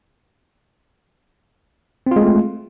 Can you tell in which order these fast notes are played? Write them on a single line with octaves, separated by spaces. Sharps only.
C4 F4 G#3 A3